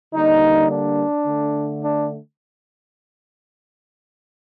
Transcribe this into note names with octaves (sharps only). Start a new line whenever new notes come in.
D3 G3 A#3 D#4
D4
D3 A3
D4